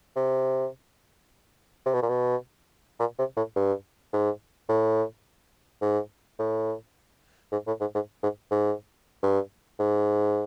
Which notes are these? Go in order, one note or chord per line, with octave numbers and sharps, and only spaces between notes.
C3
C3
B2
A#2
B2
A#2
C3
A2
G2
G#2
A2
G#2
A2
G#2
A2
G#2
G#2
G#2
G#2
G2
G#2